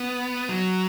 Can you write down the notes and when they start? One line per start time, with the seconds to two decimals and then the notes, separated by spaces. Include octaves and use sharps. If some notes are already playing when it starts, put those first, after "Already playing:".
Already playing: B3
0.49 F#3